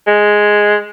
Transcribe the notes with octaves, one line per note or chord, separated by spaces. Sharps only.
G#3